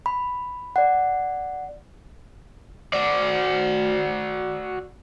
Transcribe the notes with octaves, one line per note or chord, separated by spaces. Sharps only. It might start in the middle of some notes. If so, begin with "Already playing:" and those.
B5
D5 F#5
F#4 D5